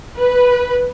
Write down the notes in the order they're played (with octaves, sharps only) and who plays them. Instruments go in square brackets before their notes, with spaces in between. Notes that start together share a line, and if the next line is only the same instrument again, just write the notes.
[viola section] B4